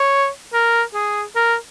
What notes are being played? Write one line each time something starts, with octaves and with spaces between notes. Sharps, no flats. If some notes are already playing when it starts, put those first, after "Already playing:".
Already playing: C#5
A#4
G#4
A#4